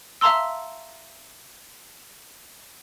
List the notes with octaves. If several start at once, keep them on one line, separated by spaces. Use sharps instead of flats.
E5 F5 A5 A#5 C6 E6